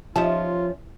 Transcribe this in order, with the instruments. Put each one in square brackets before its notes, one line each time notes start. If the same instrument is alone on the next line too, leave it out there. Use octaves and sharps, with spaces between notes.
[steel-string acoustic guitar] F3 [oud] C#4 G4 E5 [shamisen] D#4 A5 [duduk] F4